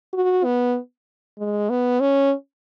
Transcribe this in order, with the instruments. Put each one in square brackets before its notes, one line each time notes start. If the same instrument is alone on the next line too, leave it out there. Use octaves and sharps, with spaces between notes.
[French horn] F#4
B3
G#3
B3
C#4